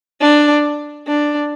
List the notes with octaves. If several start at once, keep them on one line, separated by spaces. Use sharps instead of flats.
D4
D4